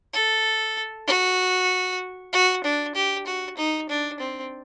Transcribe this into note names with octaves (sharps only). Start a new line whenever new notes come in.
A4
F#4
F#4
D4
G4
F#4
D#4
D4
C4